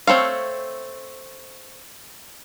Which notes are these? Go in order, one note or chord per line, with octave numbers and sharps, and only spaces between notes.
A3 C4 C#5 F5